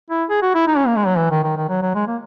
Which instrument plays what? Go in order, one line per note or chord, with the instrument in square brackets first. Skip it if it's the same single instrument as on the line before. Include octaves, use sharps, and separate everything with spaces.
[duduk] E4
G#4
F#4
E4
D#4
C#4
A#3
G#3
F#3
E3
D#3
D#3
D#3
F#3
F#3
G#3
A#3